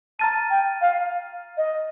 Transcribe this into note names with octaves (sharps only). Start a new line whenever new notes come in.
A5 A#5 F6 A6 D#7
G5
F5
D#5